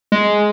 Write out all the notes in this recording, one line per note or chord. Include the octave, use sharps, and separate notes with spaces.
G#3